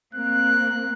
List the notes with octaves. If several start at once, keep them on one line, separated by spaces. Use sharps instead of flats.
A#3 C4 F#6